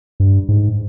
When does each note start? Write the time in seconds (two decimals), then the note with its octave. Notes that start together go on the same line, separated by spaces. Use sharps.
0.20 G2
0.49 G#2